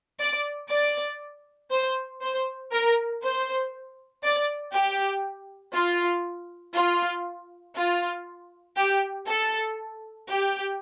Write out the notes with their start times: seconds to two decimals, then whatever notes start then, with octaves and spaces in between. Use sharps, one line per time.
0.20 D5
0.70 D5
1.71 C5
2.21 C5
2.72 A#4
3.22 C5
4.24 D5
4.74 G4
5.75 F4
6.76 F4
7.76 F4
8.77 G4
9.28 A4
10.29 G4